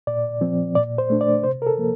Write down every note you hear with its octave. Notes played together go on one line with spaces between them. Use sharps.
A#2 D5
F3 C4
A#2 D5
C5
A3 D4
D5
C3 C5
A#4
A4
F3 A#3